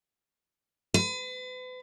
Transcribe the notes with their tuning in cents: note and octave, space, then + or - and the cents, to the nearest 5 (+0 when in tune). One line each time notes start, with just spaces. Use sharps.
B4 +40